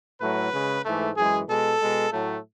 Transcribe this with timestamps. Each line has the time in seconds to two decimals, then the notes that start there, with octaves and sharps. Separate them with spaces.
0.20 A2 F#3 A3 B4
0.52 C#3 G#3
0.84 G#2 E3 A3
1.16 F#2 E3 G#3 G#4
1.48 B2 G#3 A4
1.80 B2 G#3
2.12 A2 F#3 A3